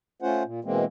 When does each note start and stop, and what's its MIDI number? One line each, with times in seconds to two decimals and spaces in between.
0.22 0.43 57
0.22 0.43 61
0.22 0.43 65
0.22 0.43 72
0.22 0.43 78
0.44 0.60 46
0.65 0.85 47
0.65 0.85 52
0.65 0.85 56
0.65 0.85 58
0.65 0.85 60